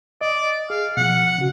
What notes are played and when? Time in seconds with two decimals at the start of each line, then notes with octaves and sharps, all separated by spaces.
0.21 D5 D#5
0.70 G#4 F5
0.97 B2 E3 F3 F#5
1.38 C#3 F#4